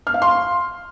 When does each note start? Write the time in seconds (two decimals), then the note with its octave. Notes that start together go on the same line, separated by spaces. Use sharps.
0.07 F6
0.14 F5
0.22 C6